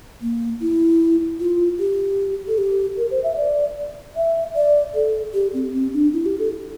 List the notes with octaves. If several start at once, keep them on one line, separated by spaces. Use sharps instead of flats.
A#3
E4
F4
G4
A4
G4
A#4
C5
E5
D5
E5
D5
A4
G4
C4
C4
D4
E4
G4
A4